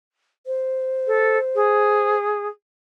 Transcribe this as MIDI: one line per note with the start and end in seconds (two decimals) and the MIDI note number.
0.46 2.17 72
1.07 1.38 69
1.55 2.47 68